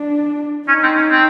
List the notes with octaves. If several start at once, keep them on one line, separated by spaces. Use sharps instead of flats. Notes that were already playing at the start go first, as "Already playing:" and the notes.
Already playing: D4
C#4 D#4
C4
C#4
C4